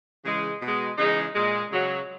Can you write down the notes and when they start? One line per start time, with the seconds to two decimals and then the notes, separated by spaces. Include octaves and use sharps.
0.24 C#3 E3 G#3
0.61 B2 G#3
0.97 C#3 E3 G#3 D#4
1.34 A#2 G#3
1.71 C#3 F#3